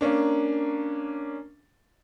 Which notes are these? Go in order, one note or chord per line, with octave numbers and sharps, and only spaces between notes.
A#3 C#4 D4